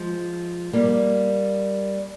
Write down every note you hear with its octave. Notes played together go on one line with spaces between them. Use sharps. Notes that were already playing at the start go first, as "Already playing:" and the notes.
Already playing: F3 G#3
G3 A#3